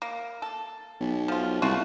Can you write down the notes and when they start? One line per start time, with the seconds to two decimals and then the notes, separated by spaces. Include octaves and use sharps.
0.02 A#3
0.42 A4
1.00 B1
1.28 F3 F4
1.62 C2 A3 F4 F#4